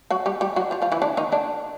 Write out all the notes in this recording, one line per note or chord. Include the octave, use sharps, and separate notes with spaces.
F#3 F#4
G3 G4
G3 G4
F#3 F#4
F3 F4
F3 F4
E3 E4
D3 D4
D#3 D#4
D3 D4